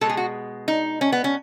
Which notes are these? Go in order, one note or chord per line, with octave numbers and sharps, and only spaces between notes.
B2 G#3 A4
G#4
F#4
D#4
C#4
B3
C#4